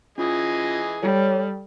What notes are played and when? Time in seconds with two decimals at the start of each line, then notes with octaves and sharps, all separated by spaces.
0.18 E3 C#4 F4 G#4 D#5
1.03 G3 A4 C#5